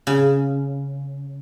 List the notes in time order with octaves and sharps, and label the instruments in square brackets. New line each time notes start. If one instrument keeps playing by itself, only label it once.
[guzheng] C#3